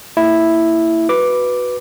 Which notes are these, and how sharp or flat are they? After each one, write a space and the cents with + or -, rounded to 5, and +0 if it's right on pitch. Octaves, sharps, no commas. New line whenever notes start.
A#3 -35 E4 +0
F#4 +0 B4 +0 D6 +0